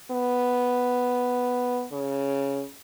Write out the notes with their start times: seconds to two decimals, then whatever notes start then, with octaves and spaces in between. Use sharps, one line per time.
0.11 B3
1.92 C#3